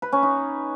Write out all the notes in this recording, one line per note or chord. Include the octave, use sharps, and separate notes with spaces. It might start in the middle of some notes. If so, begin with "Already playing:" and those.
B4
C#4
D#4